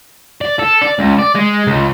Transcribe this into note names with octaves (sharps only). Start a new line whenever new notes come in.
D5
A4
D5
C#2
D5
G#3
C#2